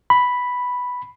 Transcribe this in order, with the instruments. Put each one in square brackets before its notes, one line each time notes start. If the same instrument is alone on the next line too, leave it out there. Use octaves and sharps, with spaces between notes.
[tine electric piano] B5